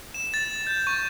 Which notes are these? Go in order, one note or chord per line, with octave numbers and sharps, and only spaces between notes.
E7
A6
G6
C#6